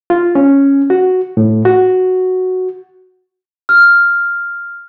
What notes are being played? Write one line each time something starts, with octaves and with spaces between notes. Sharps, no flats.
F4
C#4
F#4
A2
F#4
F6